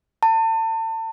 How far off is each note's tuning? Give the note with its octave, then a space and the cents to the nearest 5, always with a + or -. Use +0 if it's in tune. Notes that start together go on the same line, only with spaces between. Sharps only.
A5 +35